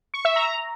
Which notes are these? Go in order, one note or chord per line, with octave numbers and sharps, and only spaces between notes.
C#6
E5
A#5